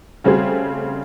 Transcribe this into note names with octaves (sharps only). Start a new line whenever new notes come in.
C#3 G3 A3 C4 F#4 G#4